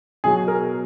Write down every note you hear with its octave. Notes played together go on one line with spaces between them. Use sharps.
B2 F#3 G#4
A#4